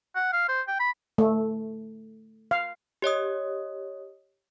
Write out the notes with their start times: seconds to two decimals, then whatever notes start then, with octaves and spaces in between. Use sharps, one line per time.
0.16 F#5
0.33 F5
0.48 C5
0.68 G5
0.79 B5
1.18 A3
2.51 F5
3.02 G4 C#5 D#5 D#6